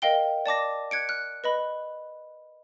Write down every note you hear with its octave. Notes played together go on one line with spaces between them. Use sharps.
A#4 D#5 F5 G5 G7
D5 A5 D6 A#6
F#6 G#6 C#7 D7
F6 F#6
B4 D#5 B5